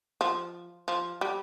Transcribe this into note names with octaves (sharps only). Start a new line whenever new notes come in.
F3
F3
G3